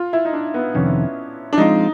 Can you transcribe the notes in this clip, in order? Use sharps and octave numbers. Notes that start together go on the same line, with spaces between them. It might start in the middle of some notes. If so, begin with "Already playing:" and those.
Already playing: F4
E4
D#4
D4
B3
F2 C3 D#3 C#4
D4
F3 G#3 C4 D#4 F4